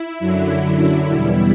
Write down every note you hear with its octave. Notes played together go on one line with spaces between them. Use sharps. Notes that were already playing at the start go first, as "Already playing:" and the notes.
Already playing: E4
F#2 D3 F#3
E2 B2 G3 E4